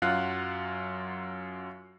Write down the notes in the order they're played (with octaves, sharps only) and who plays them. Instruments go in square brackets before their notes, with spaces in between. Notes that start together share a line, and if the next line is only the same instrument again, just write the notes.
[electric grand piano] F#2 F#3 F4 F5 F#5 F#6